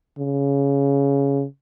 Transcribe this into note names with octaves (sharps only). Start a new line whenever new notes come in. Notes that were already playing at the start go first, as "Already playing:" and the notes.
C#3